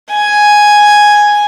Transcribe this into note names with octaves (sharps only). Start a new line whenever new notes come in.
G#5